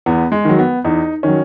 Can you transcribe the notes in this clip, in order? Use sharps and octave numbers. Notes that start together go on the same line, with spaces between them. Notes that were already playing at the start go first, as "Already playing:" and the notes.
E2 B3
G#3
D#3 F#3
B3
E2 D#4
D#3 F#3 C#4